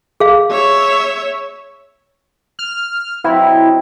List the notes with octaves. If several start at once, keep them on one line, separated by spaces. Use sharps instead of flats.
G#4 F5
C#5 E5
F6
F#3 C4 E4 D#5